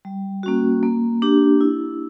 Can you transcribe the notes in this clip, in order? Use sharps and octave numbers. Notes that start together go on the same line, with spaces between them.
G3
A#3 C#4 F#4
A#3
D4 G4
E4